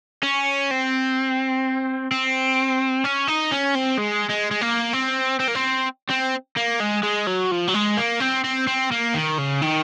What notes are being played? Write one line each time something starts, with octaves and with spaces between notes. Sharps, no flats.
C#4
C4
C4
C#4
D#4
C#4
C4
G#3
G#3
G#3
A#3
C4
C4
A#3
C4
C4
A#3
G#3
G#3
F#3
F3
F#3
G#3
A#3
C4
C4
C4
A#3
D#3
C#3
D#3